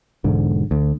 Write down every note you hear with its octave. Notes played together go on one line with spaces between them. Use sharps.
E1 G#2 D3
D2